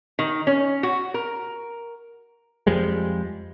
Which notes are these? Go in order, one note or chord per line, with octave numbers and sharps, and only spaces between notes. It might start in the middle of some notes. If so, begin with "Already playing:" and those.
D#3
C#4
F#4
A#4
F2 F3 G3 G#3